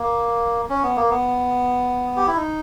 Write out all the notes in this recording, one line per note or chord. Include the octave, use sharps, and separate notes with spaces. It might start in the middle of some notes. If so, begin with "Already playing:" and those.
Already playing: A#3
C#4
B3
A#3
B3
G4
E4
D#4